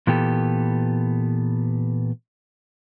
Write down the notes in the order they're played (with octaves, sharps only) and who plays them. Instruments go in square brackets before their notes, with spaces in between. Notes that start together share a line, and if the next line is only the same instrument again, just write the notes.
[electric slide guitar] A#2 E3 B3 G4 A4